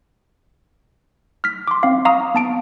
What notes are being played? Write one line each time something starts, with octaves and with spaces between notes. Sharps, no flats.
F6 B6
C6 D6
C4 F5
F5 A#5 C#6 D#6
B3 A5 D7